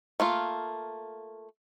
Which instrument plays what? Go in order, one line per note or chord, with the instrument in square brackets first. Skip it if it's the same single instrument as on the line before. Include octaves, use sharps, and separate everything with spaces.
[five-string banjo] A3 A#3 F4